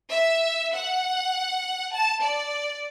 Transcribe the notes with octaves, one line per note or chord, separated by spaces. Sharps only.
E5
F#5
A5
D5